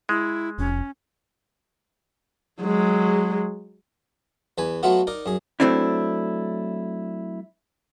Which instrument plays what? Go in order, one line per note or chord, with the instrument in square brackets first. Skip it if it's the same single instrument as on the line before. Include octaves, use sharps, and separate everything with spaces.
[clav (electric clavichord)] G#3 [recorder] E4
[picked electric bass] F1 [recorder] C#4
[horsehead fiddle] F#3 G#3
[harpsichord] E2 B4 G#5
F#3 A3 B3 F4 F#4
D#4 A#4 D5
F#2 G#4
[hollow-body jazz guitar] F#3 A3 C4 D4 E4